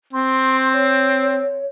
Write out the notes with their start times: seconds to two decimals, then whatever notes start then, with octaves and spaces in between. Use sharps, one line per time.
0.13 C4 C6
0.74 C#5